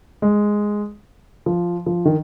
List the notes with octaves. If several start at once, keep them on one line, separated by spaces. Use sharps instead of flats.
G#3
F3
F3
D#3